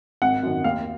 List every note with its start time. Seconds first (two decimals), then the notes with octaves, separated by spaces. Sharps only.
0.22 G#1 F#5
0.43 F#2 D#3
0.64 D#2 F5